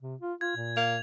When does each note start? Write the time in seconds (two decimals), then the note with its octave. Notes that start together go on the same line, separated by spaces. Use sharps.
0.02 C3
0.21 F4
0.41 F4 G#6
0.56 A#2
0.77 A#3 F7